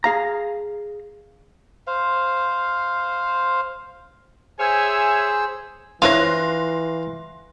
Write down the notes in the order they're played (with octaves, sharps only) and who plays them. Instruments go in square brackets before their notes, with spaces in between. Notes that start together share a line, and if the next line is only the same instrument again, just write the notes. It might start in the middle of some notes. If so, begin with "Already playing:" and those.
[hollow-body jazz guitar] G#4 F5 A#5
[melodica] C5 F5
[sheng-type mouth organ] G#4 C5 E6 [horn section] C#5 E5 G#5
[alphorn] E3 [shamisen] F3 E4 C#5 [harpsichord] F5 [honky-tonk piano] C6 F#6 A#6